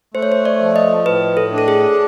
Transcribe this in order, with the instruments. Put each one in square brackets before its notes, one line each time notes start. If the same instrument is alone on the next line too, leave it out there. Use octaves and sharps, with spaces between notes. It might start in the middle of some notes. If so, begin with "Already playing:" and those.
[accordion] A3 [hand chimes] C5
[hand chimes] C#5
C5
D5
[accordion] F3
[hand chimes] D#5
[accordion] A2 [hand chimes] B4
[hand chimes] A4
[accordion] D4
[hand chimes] A4
G#4